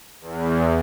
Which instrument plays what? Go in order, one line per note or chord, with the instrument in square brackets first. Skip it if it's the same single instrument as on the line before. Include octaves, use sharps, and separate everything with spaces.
[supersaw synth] E2